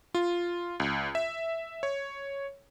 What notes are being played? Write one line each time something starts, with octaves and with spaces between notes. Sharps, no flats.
F4
C#2
E5
C#5